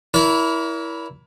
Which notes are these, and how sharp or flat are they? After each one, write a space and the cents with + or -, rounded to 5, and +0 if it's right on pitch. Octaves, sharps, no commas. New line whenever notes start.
E4 +0 A#4 +25 D5 -45